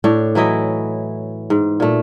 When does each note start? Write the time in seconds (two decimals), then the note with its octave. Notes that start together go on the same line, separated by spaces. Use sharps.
0.04 A2 D4 C#5
0.35 E3 F#3 E4 D#5
1.50 G#2
1.80 A#2 A3